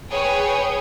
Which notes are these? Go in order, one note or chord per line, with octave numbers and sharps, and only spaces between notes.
G#4 B4 C#5 G5